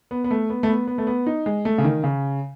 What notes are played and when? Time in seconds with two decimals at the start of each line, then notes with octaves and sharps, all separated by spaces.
0.11 B3
0.24 B3
0.31 A3
0.50 B3
0.63 A3
0.69 B3
0.88 B3
0.98 A3
1.07 B3
1.27 D#4
1.46 G#3
1.65 A3
1.78 C#3
1.84 D#3
2.04 C#3